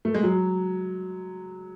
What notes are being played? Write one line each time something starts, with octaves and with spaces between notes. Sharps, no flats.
A3
G#3
F#3